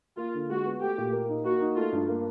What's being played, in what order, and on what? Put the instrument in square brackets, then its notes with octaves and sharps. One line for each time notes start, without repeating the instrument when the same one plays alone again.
[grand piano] A#3 [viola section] F4
[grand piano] D3
[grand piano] G#3 [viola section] F#4
[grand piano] B3
[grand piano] A3 [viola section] G4
[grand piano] A#2
A#3
D#4
[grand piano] A#3 [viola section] F#4
[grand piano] D#4
[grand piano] A3 [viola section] F4
[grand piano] G2
A#3